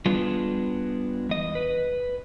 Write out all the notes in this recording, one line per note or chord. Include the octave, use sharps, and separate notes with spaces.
G3 G#3 B3 D4 F4
E2 D#5
B4